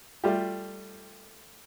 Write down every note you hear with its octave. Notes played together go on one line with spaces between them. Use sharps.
G3 A3 F4 G4